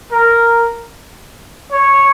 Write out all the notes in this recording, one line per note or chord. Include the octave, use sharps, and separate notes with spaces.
A#4
C#5